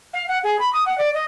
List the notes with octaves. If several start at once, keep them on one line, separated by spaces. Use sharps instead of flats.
F5
F#5
G#4
B5
D#6
F#5
D5
D#5